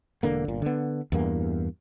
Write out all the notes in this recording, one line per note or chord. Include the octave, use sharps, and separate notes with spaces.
E1 D3 A#3
G1 A#2
D3 B3
E2 G2 A#3